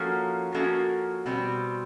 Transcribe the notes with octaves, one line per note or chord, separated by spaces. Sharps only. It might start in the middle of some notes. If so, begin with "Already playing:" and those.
Already playing: F3 A#3 C#4 F#4 A4
F3 A#3 C#4 F#4 A4
B2 G3 C4